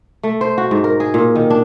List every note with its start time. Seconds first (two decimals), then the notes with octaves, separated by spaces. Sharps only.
0.23 A3
0.41 C5
0.58 F#4
0.71 G#2
0.84 A#4
1.00 G#4
1.14 A#2
1.35 D#3
1.50 D4